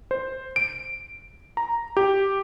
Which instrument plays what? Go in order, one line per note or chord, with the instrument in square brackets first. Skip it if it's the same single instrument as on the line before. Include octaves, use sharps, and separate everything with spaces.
[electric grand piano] C5
D7
A#5
G4